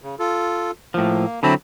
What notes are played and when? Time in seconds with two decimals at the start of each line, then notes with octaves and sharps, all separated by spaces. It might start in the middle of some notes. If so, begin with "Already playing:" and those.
0.02 C#3
0.19 F4 A4
0.94 A2 F3 A#3
1.43 D3 F#3 C4 E4 A5 B5